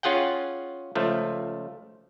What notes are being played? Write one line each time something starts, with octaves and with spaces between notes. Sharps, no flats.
C#4 F4 G#4 F#5 G5
C#2 F3 A3